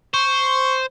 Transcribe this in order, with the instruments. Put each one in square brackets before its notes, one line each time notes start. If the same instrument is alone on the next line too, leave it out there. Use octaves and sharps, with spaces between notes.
[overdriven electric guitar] C5 [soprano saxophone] C#6